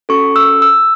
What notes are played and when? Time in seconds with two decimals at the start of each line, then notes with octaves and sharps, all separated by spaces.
0.09 C#4 F#4 A4 C#6
0.36 E6
0.62 E6